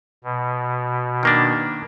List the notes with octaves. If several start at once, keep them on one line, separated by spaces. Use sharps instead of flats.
B2
D#3 A#3 D4